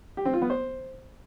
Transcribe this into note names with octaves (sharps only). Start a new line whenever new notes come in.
G4
C4
F4
B3
C5